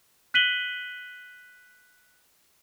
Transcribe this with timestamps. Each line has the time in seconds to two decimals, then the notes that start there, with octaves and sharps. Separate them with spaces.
0.34 F#6 B6 D#7 F#7 G7